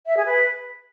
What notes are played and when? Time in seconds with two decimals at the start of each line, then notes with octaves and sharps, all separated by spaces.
0.06 E5
0.16 G#4
0.26 B4